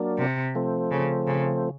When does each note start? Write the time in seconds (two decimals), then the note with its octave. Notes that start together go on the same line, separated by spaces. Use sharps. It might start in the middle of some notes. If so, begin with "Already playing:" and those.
Already playing: F#3 A#3 D4
0.19 C3
0.55 F3 A3 C4
0.91 C#3
1.27 C#3